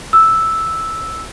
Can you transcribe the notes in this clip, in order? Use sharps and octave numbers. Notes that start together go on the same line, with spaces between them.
E6